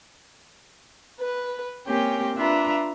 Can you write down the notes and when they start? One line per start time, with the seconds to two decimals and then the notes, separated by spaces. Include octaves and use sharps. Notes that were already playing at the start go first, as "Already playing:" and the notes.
1.20 B4
1.87 A#3 C4 C#4 G4 G5
2.36 D4 F4 B4 E5 A#5